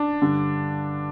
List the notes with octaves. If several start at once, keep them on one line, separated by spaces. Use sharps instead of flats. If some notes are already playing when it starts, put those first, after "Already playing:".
Already playing: D4
G2 D3